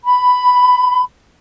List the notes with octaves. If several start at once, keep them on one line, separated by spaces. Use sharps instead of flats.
B5